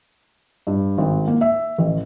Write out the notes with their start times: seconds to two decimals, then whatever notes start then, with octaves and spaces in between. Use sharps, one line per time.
0.67 G2
0.98 G#1
1.27 A#3
1.41 E5
1.78 A1